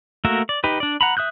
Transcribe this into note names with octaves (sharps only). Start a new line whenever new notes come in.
A3 A#3 F#4 A#4 E5
D5
D#4 G4 B4
D4 D5
F#5 A#5 B5
E5 D#6 F#6 G6